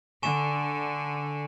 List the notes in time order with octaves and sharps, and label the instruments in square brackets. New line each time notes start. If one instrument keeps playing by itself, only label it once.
[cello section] D3 [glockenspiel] G#5 C#6 E7